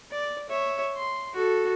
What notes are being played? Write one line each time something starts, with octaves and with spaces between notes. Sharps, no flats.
D5
C#5 E5
C6
F#4 A4